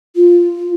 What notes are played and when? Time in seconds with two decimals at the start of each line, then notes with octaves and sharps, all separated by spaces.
0.16 F4